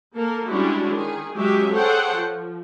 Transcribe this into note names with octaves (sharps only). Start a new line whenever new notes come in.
A#3 A4 A#4
G3 G#3 C#4 D4 E4 F#4
D#3 G#4
F#3 G#3 C#4 G4 G#4 E5
G#4 A4 C5 C#5 F#5 G5
F3